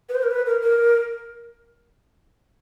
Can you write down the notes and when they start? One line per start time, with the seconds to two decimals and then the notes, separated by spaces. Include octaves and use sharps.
0.09 B4
0.15 C5
0.23 A#4
0.31 B4
0.46 A#4
0.61 A#4